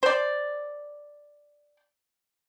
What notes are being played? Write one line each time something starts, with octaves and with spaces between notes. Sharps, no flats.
C5 D5